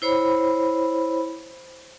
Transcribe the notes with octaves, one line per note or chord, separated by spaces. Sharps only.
E4 C5 C#5 B5